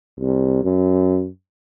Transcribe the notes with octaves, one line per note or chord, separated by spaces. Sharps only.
C2
F#2